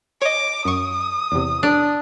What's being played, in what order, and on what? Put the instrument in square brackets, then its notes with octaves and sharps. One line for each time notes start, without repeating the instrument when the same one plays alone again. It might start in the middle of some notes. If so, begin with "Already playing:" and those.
[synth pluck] C#5 D#5 [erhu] D6
[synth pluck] F#2 C#6 [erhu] D#6
[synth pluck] E2 C3
[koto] D4